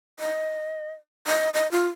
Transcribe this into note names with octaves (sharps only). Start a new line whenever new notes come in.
D#5
D#5
D#5
F4